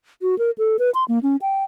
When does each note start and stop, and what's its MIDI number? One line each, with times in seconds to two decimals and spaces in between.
0.22 0.38 66
0.39 0.51 70
0.58 0.77 69
0.79 0.90 71
0.95 1.04 84
1.08 1.19 58
1.23 1.36 61
1.42 1.64 79